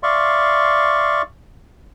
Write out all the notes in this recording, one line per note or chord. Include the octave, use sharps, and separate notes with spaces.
D5 E5 F5 C6 C#6